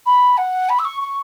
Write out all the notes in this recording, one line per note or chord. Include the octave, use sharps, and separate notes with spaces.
B5
F#5
B5
E6
C#6
C#6